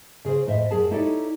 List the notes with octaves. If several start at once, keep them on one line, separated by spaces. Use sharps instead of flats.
C#3 G#4 B4 C5
F2 A2 C5 D#5 E5
F#2 G#4 A5
D#4 E4 G4 A4 C#5 D5